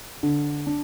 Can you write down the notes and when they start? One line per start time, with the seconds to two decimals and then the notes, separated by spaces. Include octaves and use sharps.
0.23 D3
0.67 D4